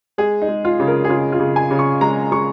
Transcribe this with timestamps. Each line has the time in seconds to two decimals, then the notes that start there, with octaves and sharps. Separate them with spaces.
0.18 G#3 G#4
0.42 D#4
0.48 G#3
0.65 F4
0.80 C#3
0.88 A#4
1.05 G#4
1.09 C#3 F4
1.32 F4
1.40 C#3
1.56 G#5
1.71 C#3
1.79 C#6
2.01 G#3 A#5
2.32 G#3 C#6